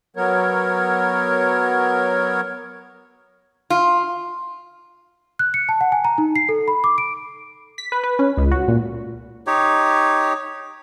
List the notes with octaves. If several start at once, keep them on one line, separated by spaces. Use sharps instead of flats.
F#3 B3 A#4 C#5
F4
F#6
C#7
A5
F#5
G#5
A#5
D#4
C7
A4
B5
D6
D7
B6
B4
B4
C#4
C#2
F#4
A#2
D#4 G4 C#5